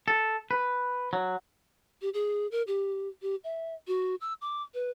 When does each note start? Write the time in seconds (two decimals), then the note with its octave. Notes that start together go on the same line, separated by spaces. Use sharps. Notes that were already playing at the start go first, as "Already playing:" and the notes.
0.08 A4
0.51 B4
1.13 F#3
2.02 G4
2.14 G#4
2.52 A#4
2.67 G4
3.22 G4
3.44 E5
3.88 F#4
4.21 E6
4.41 D6
4.74 B4